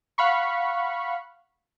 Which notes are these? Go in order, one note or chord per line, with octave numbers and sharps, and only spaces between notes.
F5 F#5 B5 C#6